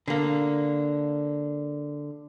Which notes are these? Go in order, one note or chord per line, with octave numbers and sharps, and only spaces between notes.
D3 A#3